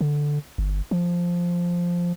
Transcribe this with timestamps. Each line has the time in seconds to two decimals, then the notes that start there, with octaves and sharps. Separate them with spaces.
0.01 D3
0.58 G1
0.91 F3